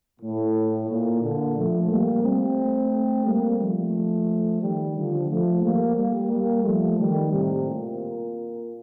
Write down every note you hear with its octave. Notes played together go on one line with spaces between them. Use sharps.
A2
A#2
A#2 D3
F3 A3
G3 A#3
A3 C4
G3 A#3
F3 A3
D#3 G3
D3 F3
F3 A3
G3 A#3
G3 A#3
G3 A#3
F3 A3
D#3 G3
A2 C3
A#2